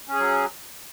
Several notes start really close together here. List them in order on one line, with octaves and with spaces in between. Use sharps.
C#4 G#4 F#3